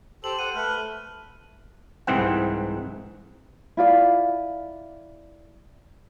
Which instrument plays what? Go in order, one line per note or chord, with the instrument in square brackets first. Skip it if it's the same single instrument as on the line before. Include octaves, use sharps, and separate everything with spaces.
[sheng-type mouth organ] G4 A4 C5 [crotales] F#7
[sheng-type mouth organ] C5 F#5 [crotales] D#7
[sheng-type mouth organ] A3 B4 [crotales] F6
[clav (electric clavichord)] C2 G#2 E3 C4 F#5
[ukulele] E4 F4 D5